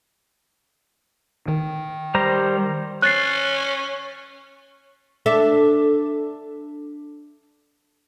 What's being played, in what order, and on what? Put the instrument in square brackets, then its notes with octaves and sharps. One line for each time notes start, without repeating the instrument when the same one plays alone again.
[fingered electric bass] D#3
[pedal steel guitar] G3 C5 A#5
[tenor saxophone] C#4 [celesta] F#6 A6 C7
[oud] D4 A4 E5